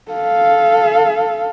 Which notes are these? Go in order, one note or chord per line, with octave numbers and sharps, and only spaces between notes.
A4 F5